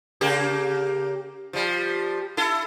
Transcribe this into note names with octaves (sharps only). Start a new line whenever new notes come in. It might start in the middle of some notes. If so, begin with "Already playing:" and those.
C#3 A#3 G4
F3 G3
E4 A4